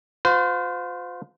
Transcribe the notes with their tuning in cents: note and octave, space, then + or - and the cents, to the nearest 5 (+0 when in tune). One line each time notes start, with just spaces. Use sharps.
F4 +35 C5 -35